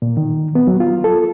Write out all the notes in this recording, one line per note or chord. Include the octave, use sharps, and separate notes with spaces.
A#2
D#3
B3
F#3
F4
A4